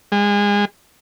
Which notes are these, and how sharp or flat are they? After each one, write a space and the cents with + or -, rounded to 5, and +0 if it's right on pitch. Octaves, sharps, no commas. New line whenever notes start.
G#3 -30